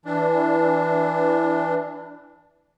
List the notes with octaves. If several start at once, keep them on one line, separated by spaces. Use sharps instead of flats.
E3 D4